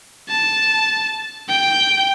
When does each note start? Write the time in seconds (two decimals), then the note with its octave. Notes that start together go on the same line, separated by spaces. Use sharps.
0.29 A5
1.49 G5